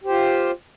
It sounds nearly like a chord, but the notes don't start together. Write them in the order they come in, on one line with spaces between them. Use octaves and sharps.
G4 C5 F4